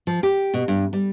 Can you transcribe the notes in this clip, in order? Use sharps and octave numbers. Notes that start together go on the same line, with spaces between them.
F3
G4
B2
G2
G3